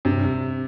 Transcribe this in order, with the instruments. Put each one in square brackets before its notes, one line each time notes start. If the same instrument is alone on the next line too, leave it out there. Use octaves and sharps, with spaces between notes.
[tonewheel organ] G2 [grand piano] C3